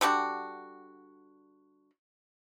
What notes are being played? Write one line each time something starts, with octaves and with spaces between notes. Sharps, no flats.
D3 G3 D4 F#4